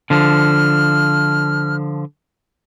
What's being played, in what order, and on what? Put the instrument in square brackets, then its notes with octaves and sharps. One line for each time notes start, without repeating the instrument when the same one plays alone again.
[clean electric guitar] D3 F3 [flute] F6